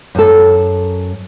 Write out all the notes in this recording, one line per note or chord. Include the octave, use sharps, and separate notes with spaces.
F#2 A4